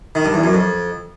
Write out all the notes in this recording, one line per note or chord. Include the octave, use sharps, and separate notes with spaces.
D#3
G2
E2
F#2
F2